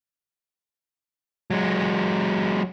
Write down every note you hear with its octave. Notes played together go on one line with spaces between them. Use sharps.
F#3 G#3